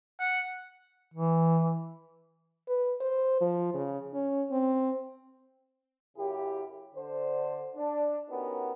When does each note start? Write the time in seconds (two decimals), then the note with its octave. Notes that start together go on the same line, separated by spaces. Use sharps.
0.19 F#5
1.14 E3
2.68 B4
3.01 C5
3.41 F3
3.74 C#3
4.13 C#4
4.51 C4
6.17 F#2 C#3 E4 G4
6.95 D3 C5
7.76 D4
8.29 B3 C#4 D#4 F#4 G4 A#4